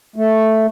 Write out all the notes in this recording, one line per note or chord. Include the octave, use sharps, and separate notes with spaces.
A3